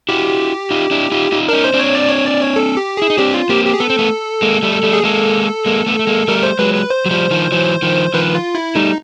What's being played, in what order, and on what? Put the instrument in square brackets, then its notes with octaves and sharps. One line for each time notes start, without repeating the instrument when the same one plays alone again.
[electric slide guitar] E4 F#4 [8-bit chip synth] G4
[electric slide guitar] D#4 F4
D4 E4
D#4 F4
D#4 F4
[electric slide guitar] D4 [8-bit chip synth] A#4
[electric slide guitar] C#4 D#4
[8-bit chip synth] C5
[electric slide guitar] C4 D4
[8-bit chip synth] C#5
D5
C#5
D5
C#5
A4
G4
[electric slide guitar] E4 [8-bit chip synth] G#4
[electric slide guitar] D#4
[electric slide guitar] C4 D4 [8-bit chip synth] G4
[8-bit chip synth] F4
[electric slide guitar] A#3 C4 [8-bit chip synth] G4
[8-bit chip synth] G4
G#4
[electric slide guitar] B3 [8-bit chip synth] A4
[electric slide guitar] C4
A3 B3
G#3 A#3
G3 A3
G3 A3
[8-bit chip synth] G#4
[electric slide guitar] G#3 A#3 [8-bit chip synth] A4
[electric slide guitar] G#3 A#3
A3 B3
A3
G#3 A#3
[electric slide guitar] G3 A3 [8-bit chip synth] A#4
[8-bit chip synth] C5
[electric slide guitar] F#3 G#3 [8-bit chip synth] B4
[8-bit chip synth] B4
C5
[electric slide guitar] F#3
F3 G3
D#3 F3
E3 F#3
D#3 F3
[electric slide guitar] D#3 F3 [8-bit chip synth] B4
[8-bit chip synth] F4
E4
[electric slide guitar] G3 A3 [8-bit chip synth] D#4